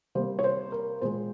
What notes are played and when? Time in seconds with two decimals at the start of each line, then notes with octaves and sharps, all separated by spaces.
0.15 C3 G3 A#3 C5
0.39 C#5
0.44 C5
0.72 A#4
1.01 A#2 G#3 C5